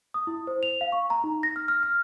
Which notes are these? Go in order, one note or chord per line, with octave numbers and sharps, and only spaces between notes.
D#6
E4
C5
F7
F5
C#6
A#5
D#4
A#6
F6
F6
F6